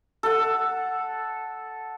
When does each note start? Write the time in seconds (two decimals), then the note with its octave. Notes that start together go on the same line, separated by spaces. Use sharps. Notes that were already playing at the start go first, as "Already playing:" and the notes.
0.23 A4 F#5